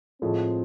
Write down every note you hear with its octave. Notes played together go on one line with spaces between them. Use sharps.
A2 F3 G#3 C4